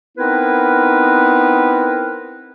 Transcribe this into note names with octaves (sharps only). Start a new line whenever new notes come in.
B3 C4 D#4 E4 A#4 B4